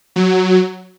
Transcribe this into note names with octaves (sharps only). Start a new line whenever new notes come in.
F#3